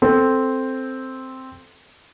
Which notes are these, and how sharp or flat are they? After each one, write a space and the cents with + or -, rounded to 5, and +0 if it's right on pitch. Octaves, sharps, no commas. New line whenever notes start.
C4 +0 A4 +0